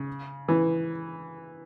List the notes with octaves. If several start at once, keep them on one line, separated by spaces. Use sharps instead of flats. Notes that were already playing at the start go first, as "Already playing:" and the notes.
Already playing: C#3
E3